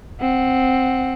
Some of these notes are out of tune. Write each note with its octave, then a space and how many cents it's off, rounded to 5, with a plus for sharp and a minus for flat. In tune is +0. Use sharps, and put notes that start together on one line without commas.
C4 +0 F#5 +0